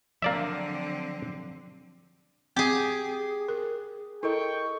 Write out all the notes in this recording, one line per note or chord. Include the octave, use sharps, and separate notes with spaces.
D3 F3 F#3 A#3 C4 D5 E5
C4 G4 G#4
A#4
E4 A4 A#4 D#5 G5 C#6